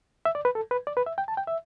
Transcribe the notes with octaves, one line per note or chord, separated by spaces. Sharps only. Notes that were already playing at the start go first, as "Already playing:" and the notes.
E5
D5
B4
A4
B4
D5
B4
E5
G5
A5
G5
E5